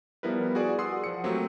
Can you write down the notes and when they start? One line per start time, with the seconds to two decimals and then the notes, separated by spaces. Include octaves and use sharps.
0.23 F3 G3 B3 E4 A#4 B4
0.55 F#4 G#4 D5
0.79 F#5 C6 D#6 E6 C7
1.04 F3 F#5 C#7
1.24 F#3 A3 A#3 C4 G4